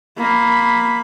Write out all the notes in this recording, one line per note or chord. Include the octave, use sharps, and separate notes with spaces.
A#3 B5